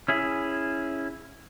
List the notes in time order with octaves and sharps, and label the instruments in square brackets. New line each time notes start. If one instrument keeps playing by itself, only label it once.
[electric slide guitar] C#4 E4 G#4